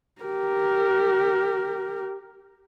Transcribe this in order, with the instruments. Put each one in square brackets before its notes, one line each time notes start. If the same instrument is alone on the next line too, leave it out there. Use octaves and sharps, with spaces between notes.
[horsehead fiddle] G4 A#4